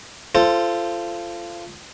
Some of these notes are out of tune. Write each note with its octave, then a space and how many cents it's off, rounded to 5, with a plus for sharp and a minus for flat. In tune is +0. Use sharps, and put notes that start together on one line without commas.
F4 -25 A4 +0 C5 +0